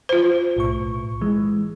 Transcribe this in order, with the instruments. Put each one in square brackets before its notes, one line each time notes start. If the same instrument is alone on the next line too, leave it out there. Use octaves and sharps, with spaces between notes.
[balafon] F4 C5
[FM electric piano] B1 A2 C#6
E3 G#3